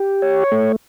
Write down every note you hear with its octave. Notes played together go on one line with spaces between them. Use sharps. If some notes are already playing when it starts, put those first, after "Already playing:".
Already playing: G4
C#5
A3